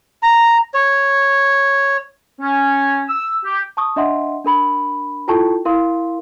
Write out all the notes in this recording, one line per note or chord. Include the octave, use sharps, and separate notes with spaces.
A#5
C#5
C#4
E6
G4
A5 C#6 D#6
D4 D#5 E5 F#5 C6
D4 A#4 B5
E4 F4 A4 G5 A5 C#6
E4 A#4 F5 C6